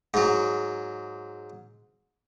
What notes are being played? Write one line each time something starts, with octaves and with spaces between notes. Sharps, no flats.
G#2 F#3